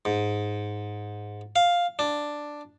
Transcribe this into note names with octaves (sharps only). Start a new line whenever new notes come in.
G#2
F5
D4